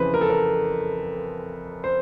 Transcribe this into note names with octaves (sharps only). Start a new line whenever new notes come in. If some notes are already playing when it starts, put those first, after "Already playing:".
Already playing: F2 C#3 E3 B4 C5
A#4
A4
A#4
C5